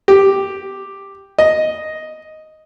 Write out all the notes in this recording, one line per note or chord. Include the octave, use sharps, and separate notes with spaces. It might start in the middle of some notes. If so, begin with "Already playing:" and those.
G4
D#5